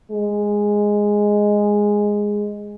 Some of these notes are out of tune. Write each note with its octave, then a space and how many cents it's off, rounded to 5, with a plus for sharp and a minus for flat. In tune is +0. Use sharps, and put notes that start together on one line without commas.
G#3 -5